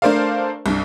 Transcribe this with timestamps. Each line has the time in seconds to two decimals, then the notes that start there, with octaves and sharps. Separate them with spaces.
0.02 A3 D4 A#4 C5 D5 F5
0.66 C2 G2